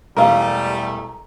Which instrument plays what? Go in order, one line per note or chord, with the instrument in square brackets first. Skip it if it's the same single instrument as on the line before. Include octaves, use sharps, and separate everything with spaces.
[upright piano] E1 [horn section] G3 A3 [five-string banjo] A#4 F5 [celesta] A#5